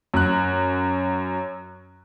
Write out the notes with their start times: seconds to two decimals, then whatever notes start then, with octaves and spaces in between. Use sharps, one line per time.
0.14 F#2 F#6